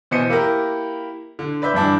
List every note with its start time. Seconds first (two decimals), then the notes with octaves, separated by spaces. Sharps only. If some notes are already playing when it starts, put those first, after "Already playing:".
0.11 B2 E3 C5 D#5 C#7 D#7
0.29 A#3 E4 G4 A#4
1.39 D3
1.62 B4 D5 E5 G6
1.74 G2 E3 D4 E4